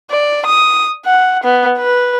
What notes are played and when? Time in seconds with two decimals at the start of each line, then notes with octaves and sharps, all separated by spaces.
0.11 D5
0.46 D#6
1.05 F#5
1.44 B3
1.78 B4